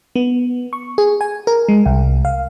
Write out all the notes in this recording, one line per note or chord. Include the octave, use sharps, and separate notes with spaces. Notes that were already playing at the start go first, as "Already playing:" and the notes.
B3
C#6
G#4
G#5
A#4
G#3
C2
F5